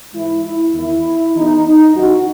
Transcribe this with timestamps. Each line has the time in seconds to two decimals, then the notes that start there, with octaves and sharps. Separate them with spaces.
0.13 G#2 E3 E4
0.44 E4
0.73 E2 D#3 E4
1.34 E2 B2 D#4
1.65 D#4
1.95 F#2 E3 F#4